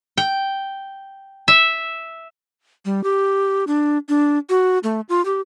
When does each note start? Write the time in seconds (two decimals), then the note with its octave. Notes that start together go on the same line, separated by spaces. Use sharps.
0.18 G5
1.48 E5
2.85 G3
3.04 G4
3.67 D4
4.09 D4
4.50 F#4
4.83 A3
5.09 F4
5.25 G4